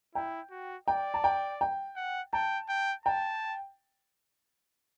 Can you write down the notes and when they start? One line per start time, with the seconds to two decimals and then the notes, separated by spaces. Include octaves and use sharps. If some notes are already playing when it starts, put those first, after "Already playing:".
0.15 E4 G5
0.51 F#4
0.88 D5 G5
1.14 A5
1.24 G5
1.61 G5
1.96 F#5
2.33 G5 A5
2.69 G5
3.06 G5 A5